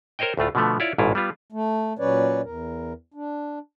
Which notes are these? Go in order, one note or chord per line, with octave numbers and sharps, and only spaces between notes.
A#4 C5 C#5 D#5 G5
D2 A2 A3 F4
B2 D3 F3 A3 B3
E4 F4 C#5 D5
A1 G#2 B2 E4 F4
G3 B3 F4
A3
A#2 F#3 C#4 B4 C#5 D5
E2 A#4
D4